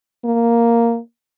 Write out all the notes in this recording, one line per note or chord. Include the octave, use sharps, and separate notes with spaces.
A#3